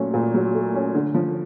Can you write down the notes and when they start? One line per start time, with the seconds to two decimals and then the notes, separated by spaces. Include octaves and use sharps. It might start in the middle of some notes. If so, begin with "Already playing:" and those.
Already playing: A#2 F#3 A3 C#4
0.14 A#2
0.34 F#3
0.54 A3
0.74 C#4
0.94 D3
1.14 F3